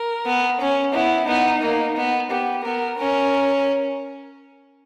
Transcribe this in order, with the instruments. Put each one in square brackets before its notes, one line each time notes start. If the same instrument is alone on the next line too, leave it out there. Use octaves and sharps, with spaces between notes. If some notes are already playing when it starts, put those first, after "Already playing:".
Already playing: [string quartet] A#4
[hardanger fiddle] B3
C#4
[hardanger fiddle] B3 [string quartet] E4
[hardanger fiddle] B3 [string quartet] D#4
[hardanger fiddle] A#3
B3
[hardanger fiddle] B3 [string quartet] G4
[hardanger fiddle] B3 [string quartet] A#4
[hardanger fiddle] C#4 [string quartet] A#4